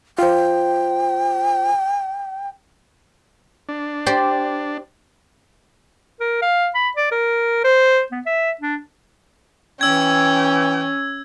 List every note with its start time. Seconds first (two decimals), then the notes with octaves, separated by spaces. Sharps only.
0.19 F4 C5 G5
3.69 D4
4.06 G4 C5 D5
6.20 A#4
6.42 F5
6.75 B5
6.97 D5
7.11 A#4
7.64 C5
8.12 B3
8.26 E5
8.61 D4
9.81 E3 C#4 G5 E6 G#6